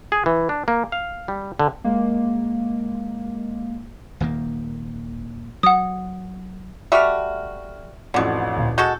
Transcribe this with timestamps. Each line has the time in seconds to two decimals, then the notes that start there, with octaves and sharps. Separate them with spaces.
0.12 G#4
0.26 E3
0.49 D4
0.68 A#3
0.92 F5
1.28 G3
1.59 D3
1.84 G#3 A#3
4.20 D#1 D#3 A#3
5.63 F#3 F#5 D#6
6.92 G3 A3 F#4 E5 C#6 F6
8.14 A1 F2 B2 D3
8.57 D2 A#2
8.78 G#3 F#4 A4 C#6 G6